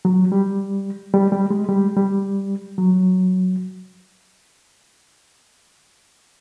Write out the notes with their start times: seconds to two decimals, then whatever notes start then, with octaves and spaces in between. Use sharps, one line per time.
0.05 F#3
0.32 G3
1.14 G3
1.32 G3
1.50 G#3
1.68 G3
1.97 G3
2.78 F#3